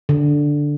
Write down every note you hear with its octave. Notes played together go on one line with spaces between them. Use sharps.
D3